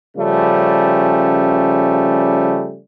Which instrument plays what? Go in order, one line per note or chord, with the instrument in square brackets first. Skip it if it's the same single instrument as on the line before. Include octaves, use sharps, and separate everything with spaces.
[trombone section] C#3 F3 G3 A3 C#4